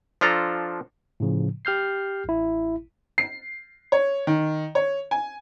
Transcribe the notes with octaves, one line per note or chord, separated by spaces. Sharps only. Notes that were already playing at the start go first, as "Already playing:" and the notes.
F3 D4 F4 A4 A#5
A2 C#3 F3
G4 F6 G6 C7
A1 E4
C7
C#5
D#3
C#5
G#5